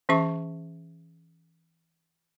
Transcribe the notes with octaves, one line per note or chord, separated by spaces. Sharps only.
E3 C#4 G#4 E5 C#6